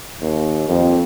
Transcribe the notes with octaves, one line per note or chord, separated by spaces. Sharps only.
D#2
F2